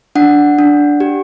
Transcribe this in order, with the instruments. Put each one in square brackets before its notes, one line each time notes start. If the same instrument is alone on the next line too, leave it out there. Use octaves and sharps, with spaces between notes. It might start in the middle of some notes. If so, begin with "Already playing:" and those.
[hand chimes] D4 F#5
D4
G4